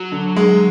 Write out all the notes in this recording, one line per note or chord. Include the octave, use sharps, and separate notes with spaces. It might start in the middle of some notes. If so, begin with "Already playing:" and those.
Already playing: F#3
D3
G#3